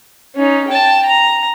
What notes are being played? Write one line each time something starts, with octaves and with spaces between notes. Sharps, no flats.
C#4 D#4
G5 A5
A#5